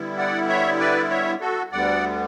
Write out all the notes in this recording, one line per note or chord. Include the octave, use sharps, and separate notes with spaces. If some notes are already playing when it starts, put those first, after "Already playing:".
Already playing: D3 G3 B3 E4
D5 F#5
C#5 E5
B4 D5
C#5 E5
F#4 A4
D2 D3 G3 B3 D5 F#5